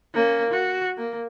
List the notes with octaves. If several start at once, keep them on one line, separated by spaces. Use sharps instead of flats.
A#3 C#4
F#4
A#3